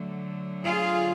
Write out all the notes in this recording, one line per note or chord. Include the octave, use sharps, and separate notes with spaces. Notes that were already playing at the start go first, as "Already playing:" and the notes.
Already playing: D3 F#3 A3
F4 G#4